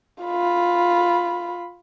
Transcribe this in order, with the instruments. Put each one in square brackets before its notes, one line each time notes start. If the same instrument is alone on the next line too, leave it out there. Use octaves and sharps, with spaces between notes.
[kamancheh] F4 B5